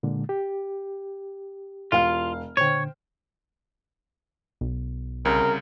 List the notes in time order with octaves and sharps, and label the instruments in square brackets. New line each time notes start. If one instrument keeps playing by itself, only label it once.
[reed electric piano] A#2 D3 G#3
G4
[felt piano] E1 F5 F6 [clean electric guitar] F4
[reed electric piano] A#2 D3 [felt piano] C5 G5 [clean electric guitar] C#5
[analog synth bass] B1
[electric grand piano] C2 C#3 [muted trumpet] A#4